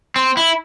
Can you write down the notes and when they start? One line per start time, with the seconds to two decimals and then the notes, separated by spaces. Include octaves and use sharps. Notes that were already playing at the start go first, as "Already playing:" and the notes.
0.16 C4
0.37 E4